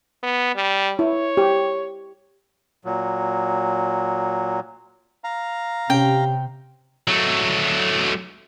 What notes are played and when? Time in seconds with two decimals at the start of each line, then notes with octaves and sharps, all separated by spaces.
0.23 B3
0.55 G3
0.99 E4 C#5
1.37 G4
2.85 A#2 F#3
5.24 F5 A#5
5.90 C3 C#4 G4 G5
7.08 F#3 A3